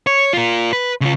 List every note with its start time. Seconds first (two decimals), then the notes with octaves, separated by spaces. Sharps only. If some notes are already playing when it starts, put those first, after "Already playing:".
0.07 C#5
0.33 F4 A#4
0.73 B4
1.01 C#3 F4